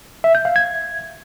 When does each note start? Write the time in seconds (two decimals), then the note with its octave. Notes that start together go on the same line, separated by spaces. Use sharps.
0.24 E5
0.35 G6
0.45 F5
0.56 G#6